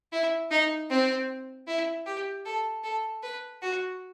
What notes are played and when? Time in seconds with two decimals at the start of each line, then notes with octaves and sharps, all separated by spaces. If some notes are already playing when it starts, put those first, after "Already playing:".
0.13 E4
0.51 D#4
0.90 C4
1.68 E4
2.06 G4
2.45 A4
2.84 A4
3.23 B4
3.62 F#4